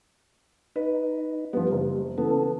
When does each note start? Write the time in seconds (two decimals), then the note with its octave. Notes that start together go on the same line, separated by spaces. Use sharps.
0.76 D#4 B4
1.53 F3 G3 B3
1.72 F#1
2.18 C#3 E3 B3 A4